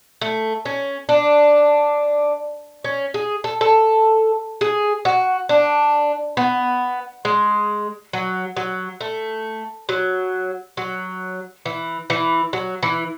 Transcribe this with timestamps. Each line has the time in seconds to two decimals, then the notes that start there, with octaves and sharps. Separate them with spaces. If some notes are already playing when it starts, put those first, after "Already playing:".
0.21 A3
0.65 C#4
1.09 D4
2.84 C#4
3.14 G#4
3.44 A4
3.61 A4
4.61 G#4
5.05 F#4
5.49 D4
6.37 B3
7.25 G#3
8.13 F#3
8.57 F#3
9.01 A3
9.89 F#3
10.77 F#3
11.66 E3
12.10 E3
12.53 F#3
12.83 E3